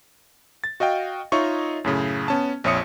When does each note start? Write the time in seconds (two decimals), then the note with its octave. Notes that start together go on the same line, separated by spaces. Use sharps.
0.64 A6
0.80 F#4 D#5 F5 G5
1.32 D#4 F4 C#5 D#5 E5 C#6
1.84 F#2 A2 C#3
2.28 B3 C#4 A5
2.64 A#1 F2 C#5 E5 D#6 C#7